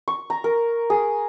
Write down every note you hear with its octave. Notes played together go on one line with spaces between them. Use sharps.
C#6
A#5
A#4
G#4